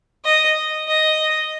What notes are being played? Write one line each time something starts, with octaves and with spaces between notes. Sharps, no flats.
D#5
D#5